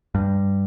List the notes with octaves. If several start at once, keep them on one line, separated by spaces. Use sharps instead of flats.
G2